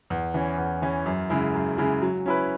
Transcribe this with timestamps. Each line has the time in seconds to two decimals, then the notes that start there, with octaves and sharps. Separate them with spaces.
0.10 E2
0.34 E3 C#4
0.58 E2
0.82 E3 C#4
1.06 F#2
1.30 C#3 G#3 E4
1.54 F#2
1.78 C#3 G#3 E4
2.02 F#3
2.26 C#4 E4 B4